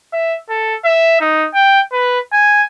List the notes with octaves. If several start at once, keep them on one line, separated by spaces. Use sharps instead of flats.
E5
A4
E5
D#4
G5
B4
G#5